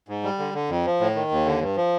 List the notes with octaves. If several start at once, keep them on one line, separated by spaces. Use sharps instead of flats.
G#2
G3
D3
D3
F2
F3
A2
D#3
D#2
D3
G2
F3